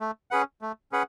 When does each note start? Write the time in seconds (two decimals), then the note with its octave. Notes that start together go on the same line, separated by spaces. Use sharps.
0.01 A3
0.31 C#4 G#4 B4 F#5
0.61 A3
0.92 C#4 G#4 B4 F#5